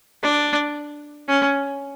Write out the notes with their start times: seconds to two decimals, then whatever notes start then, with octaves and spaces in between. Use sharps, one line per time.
0.23 D4
1.28 C#4